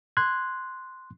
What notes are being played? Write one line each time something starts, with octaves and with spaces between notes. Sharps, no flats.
C6 F#6 G#6